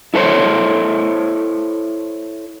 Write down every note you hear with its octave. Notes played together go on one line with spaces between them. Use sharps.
E4 A4 A#4 C5 C#5